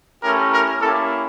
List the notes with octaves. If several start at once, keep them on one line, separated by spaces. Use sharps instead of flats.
A3 C#4 E4 G4 A#4
A#4
A#3 C#4 E4 G4 A4